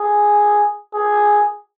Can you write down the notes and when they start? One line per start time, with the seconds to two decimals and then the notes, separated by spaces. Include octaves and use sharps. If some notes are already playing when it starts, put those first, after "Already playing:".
Already playing: G#4
0.94 G#4